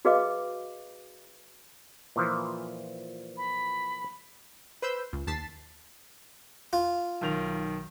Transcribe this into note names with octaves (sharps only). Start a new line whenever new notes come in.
F#4 G#4 B4 D#5 F5 D6
A#2 E3 F3
B5
B4 C5 E6 G6
C#2
D#2 A5 A6 B6 C7
F4
B1 D#3 F7